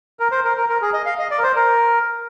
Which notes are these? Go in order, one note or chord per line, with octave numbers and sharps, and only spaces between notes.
A#4
C5
A#4
A#4
A#4
G#4
D#5
F5
D#5
D5
A#4
C5
A#4